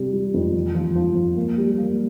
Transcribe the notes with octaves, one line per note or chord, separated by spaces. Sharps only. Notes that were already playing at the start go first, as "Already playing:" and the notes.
Already playing: C3 G3
G3
F2
F3
F3
F3
F3
A#3
G3
A#3